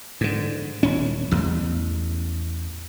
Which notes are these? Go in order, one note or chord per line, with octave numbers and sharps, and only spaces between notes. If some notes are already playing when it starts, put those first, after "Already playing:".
G#2 D3
D#1 C#4
A1 E2